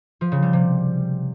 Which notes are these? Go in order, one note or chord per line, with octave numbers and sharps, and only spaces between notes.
F3
C#3
G3
C3